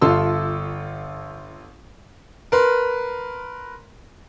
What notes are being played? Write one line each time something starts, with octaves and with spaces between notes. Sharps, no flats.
G1 F4 A4 C6 E6
A#4 B4 C6